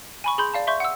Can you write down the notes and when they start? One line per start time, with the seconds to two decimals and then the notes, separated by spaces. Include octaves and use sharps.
0.24 G#5 B5 C#6
0.38 G#4 B5 C6 G6
0.53 D5 F5 A5
0.67 E5 C6 C#6 G6
0.80 F#5 E6